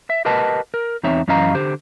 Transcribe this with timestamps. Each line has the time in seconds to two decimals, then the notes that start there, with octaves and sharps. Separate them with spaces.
0.10 E5
0.25 G4 A#4 B4 D#5 F#5 A5
0.74 A#4
1.03 E2 C4 D#4 C#5 E5
1.28 F#2 E3 C#4 D#5 F5 A#5
1.54 D3 G4 C5